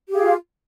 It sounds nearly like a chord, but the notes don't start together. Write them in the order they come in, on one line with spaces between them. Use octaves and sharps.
G4 G#4 F5 F4